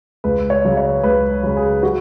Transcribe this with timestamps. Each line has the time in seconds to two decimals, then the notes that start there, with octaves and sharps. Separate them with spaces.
0.24 C#2 B4
0.50 C#5
0.64 C#3 F#3
0.77 C#5
1.03 C#2 B4
1.43 C#3 F#3
1.57 G#4
1.83 F#4